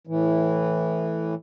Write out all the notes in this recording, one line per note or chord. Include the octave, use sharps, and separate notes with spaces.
A2 E3